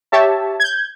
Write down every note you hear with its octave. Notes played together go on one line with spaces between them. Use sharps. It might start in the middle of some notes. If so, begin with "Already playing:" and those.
G4 C#5 E5 A5
G6 G#6